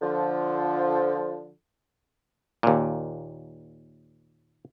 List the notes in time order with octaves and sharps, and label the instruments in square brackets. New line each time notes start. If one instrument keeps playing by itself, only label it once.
[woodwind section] D3 F3
[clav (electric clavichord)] D#2 A#2